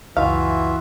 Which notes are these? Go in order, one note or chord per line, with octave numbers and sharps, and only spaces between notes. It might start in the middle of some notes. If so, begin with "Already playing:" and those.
C#2 F#2 E3 F4 F#4 E5 F5